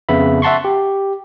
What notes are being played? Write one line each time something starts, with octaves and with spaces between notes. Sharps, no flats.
F2 C#3 B3 E5 B5
E5 F#5 A5 C6 C#6
G4